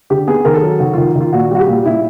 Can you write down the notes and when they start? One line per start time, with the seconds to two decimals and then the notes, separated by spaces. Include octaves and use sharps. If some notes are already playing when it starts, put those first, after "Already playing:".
0.10 D3 G4
0.28 B3 G#4
0.45 D#3 A#4
0.54 A4
0.63 F#3
0.80 D#3 F#4
0.93 D#3 F4
1.16 D#3 F4
1.33 A#2 F#4
1.51 G3 F#4
1.60 G4
1.68 A#2
1.86 A#2 E4